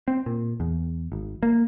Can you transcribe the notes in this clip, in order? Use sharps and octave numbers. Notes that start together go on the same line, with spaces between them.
C4
A#2
E2
G#1
A#3